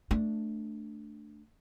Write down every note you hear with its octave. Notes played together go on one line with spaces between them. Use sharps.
A3 D4